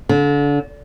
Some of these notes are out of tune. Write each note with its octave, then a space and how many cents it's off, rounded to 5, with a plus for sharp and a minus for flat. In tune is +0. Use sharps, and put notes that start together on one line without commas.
D3 -30